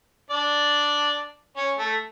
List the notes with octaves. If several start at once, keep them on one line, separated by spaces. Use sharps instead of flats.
D4 D5
C#4 C#5
A3 A4